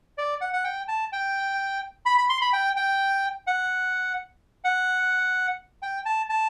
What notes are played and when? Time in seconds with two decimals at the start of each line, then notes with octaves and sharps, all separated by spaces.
0.18 D5
0.41 F#5
0.53 F#5
0.64 G5
0.88 A5
1.12 G5
2.06 B5
2.18 B5
2.29 C6
2.41 B5
2.53 G5
2.76 G5
3.47 F#5
4.64 F#5
5.83 G5
6.05 A5
6.29 A5